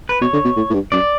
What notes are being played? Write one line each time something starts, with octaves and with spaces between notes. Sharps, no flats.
B4
B2 C#5
D3
B2
A2
A2
G2
F#2 D5